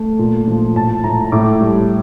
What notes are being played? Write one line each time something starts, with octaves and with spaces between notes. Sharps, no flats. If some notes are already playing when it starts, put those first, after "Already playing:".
Already playing: A3
A#2
F3
A2 A5
A2 A#5
A2 D6
G3